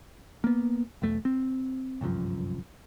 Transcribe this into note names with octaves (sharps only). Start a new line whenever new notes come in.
A#3 B3
B1 E2 A3
C4
G1 C2 F#2 F3